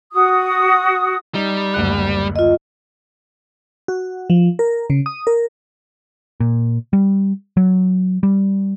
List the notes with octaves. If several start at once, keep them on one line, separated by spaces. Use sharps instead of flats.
F#4 D#6
G3 D#4
F#1 D2 F#6
F4 D#5
F#4
F3
A#4
C#3
D#6
A#4
A#2
G3
F#3
G3